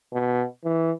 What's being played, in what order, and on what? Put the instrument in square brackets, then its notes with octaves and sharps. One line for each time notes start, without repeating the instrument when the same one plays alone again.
[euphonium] B2
E3